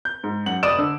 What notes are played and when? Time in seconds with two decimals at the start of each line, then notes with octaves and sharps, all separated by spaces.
0.05 G6
0.23 G#2
0.46 F#2 F#5 F#7
0.63 F1 D5 D#6 D7 E7
0.78 D3 E6